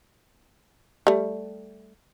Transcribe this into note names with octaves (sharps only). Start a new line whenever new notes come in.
G3 A3